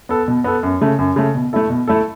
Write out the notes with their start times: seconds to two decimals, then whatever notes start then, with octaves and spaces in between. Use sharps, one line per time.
0.09 B3 A4
0.28 B2
0.44 B3 A4
0.63 F#2
0.81 C#3 A3
0.99 F#2
1.16 C#3 A3
1.35 B2
1.53 A3 E4 A4
1.70 B2
1.88 A3 E4 A4